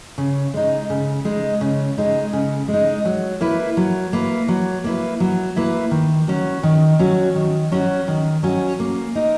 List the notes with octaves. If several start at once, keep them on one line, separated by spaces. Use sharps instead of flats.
C#3
G#3 D#4
C#3
G#3 D#4
C#3
G#3 D#4
C#3
G#3
D#4
F#3
A#3 E4 B4
F#3
A#3 E4 B4
F#3
A#3 E4 B4
F#3
A#3 E4 B4
D#3
F#3 C#4 F#4
D#3
F#3 C#4 F#4
D#3
F#3 C#4 F#4
D#3
F#3 C#4 F#4
A#3
D#4 A#4